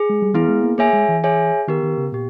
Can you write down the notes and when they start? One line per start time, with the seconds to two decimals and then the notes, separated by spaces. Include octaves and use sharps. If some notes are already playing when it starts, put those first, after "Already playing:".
Already playing: G#4
0.10 G#3
0.22 G3
0.34 E3 B3 E4 G#4
0.49 G#3
0.64 A#3
0.78 A#3 G#4 C#5 E5 G#5
0.93 G#3
1.08 E3
1.24 G#4 C#5 E5 G#5
1.68 D#3 B3 G4 A#4
1.83 D#3
1.98 C#3
2.12 A#2 B3 G4